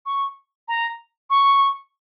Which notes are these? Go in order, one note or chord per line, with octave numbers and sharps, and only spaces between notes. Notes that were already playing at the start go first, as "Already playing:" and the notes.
C#6
A#5
C#6